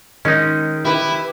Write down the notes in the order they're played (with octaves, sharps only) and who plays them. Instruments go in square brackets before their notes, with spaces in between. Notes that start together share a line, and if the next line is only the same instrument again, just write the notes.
[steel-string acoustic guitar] D#3 [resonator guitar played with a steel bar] G#3 [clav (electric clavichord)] C#4 D#4
[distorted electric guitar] E4 [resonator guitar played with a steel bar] G4 B4